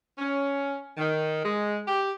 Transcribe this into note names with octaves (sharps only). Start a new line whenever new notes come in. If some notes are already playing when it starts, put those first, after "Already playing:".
C#4
D#3
G#3
G4